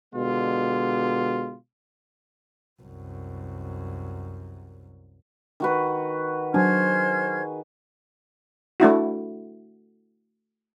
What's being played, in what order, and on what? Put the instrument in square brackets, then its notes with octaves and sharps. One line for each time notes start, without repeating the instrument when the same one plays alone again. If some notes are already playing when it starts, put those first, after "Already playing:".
[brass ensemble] B2 D3 G#3 F4
[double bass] C2 F#2
[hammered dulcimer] D#3 F#4 B4
[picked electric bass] F#3 D4 [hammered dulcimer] G#4 [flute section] C5 F6 G#6
[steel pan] A3 D4 E4 F#4